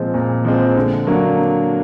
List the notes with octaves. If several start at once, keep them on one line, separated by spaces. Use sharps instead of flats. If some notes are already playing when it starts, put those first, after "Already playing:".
Already playing: A#2 F3 G#3 C4
A#2
F3 G#3 C4
D3
F#3 A#3 D4